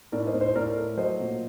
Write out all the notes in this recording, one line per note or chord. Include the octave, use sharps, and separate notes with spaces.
A2 A#4 D5
C5 D#5
A2
C5 D#5
A2 A#4 D5
A3
F#3 C5 D#5
A#2